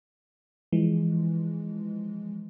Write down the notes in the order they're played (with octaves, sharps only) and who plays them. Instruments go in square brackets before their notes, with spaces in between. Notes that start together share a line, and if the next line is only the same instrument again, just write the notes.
[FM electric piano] E3 F3 G#3